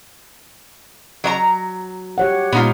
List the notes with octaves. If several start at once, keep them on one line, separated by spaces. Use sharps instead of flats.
F#3 D5 A#5
G4 C#5 F#5
A#2 G#3 B3 D#4 F4